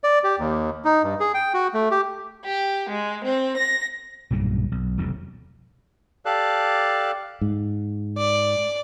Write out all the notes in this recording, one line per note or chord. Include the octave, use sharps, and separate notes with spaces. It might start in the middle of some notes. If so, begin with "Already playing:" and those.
D5
G4
D#2
D#4
G2
G#4
G5
F#4
A3
G4
G4
G#3
C4
A#6
B1 G2 A#2 C#3
B1
F1 B1 F2 C3
G4 A4 D5 F5 A5 F#6
G#2
D5